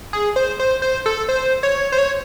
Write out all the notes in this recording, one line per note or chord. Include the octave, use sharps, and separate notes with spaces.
G#4
C5
C5
C5
A4
C5
C#5
C5
C#5